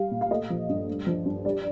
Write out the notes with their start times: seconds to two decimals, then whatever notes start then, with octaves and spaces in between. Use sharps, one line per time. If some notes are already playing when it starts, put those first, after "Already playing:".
Already playing: G3 F5
0.11 A#2
0.21 F5
0.31 A3 D#5
0.50 F3
0.69 G2
0.88 A3
1.07 F3
1.25 G2
1.45 G3 D5